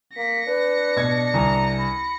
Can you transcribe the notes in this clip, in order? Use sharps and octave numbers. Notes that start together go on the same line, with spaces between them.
A#3 A#6 B6 C#7
D4 B4
B2 G#6
C2 G#5 A#5
B5